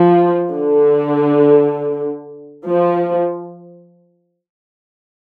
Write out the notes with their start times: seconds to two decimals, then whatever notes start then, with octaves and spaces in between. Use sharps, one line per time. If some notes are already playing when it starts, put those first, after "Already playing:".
Already playing: F3
0.52 D3
2.66 F3